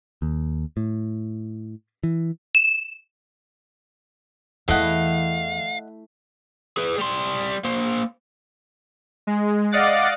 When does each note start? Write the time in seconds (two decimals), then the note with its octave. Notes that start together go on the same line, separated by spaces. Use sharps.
0.22 D#2
0.77 A2
2.03 E3
2.55 E7
4.68 E2 E3 A3 E4 D#5 F5 F#5
6.77 G#4 B4
6.98 G3 C6
7.65 A#3 C5
9.27 G#3
9.71 D5 D#5 F5 F#5 D6 A6